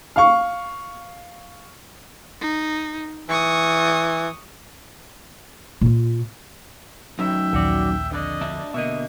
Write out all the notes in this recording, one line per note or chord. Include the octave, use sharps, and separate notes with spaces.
F5 C#6
D#4
E3 C#6 D#6
A#2 F4
F#3 C#4 D#4 E5 G5
A#1 D#2 F#4 D5
F2 D3 D5 D#5
D4 E5
B2 D3 A#3 D#5 E5